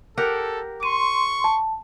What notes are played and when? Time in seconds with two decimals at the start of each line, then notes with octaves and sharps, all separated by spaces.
0.18 G4 A4 A#4 F#5
0.83 C6 C#6 D#7
1.44 A5